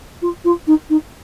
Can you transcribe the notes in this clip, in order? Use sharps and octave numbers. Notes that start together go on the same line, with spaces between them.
F4
F4
D#4
D#4